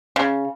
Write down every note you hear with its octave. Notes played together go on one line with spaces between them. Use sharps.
C#3